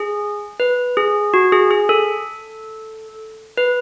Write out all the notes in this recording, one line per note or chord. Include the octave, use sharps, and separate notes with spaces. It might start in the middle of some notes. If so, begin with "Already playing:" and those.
Already playing: G#4
B4
G#4
F#4
G#4
G#4
A4
B4